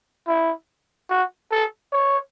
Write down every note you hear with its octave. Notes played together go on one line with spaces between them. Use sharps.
E4
F#4
A4
C#5